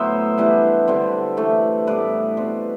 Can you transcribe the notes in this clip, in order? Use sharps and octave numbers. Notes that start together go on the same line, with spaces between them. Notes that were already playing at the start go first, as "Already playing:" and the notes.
Already playing: A2 F#3 B3 C5 E5
E3 G3 B3 D4
D3 G3 C4
E3 A3 D4
A2 G3 B3 B4 D5
B2 G3 C4